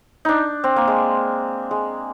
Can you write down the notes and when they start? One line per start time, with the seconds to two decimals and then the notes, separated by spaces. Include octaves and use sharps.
0.25 D4 D#4
0.64 C4
0.76 A#3
0.88 G#3
1.71 G#3